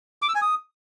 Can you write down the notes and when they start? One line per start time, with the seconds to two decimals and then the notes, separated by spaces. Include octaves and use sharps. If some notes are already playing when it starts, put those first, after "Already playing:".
0.22 D6
0.29 E6
0.35 G#5
0.42 D#6